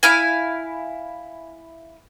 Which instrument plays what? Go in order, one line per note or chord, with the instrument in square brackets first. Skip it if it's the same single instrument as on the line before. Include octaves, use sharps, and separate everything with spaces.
[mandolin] E4 F5 G#5